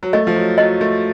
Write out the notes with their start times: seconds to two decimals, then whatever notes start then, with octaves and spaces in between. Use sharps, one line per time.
0.03 F#3
0.13 A3 D#5
0.27 F3
0.36 F#3
0.58 F#3 D#5
0.81 A3